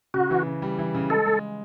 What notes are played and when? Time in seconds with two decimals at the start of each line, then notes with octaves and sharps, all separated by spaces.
0.14 C#3 F#4
0.31 E3
0.47 C#3
0.62 G3
0.78 E3
0.95 C#3
1.10 G#3 A4
1.26 G#3